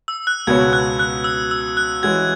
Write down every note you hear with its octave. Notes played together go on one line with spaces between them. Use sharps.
E6
F#6
C#2 B2 B3 F#4 C#5 G#6
F#6
F#6
E6
E6
F#6
E3 G#3 C#4 F#4 G#6